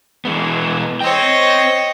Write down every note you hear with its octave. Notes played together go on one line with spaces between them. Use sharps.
E3 G#3 B3
C5 C#5 D#5 G5